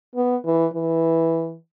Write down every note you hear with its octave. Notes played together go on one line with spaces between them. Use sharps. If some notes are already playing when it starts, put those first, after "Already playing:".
B3
E3
E3